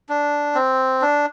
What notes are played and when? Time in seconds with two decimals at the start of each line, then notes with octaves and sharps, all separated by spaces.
0.09 D4
0.55 C4
1.02 D4